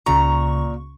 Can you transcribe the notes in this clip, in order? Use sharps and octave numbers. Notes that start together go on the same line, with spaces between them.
C#2 A#2 C#3 A#5 C#6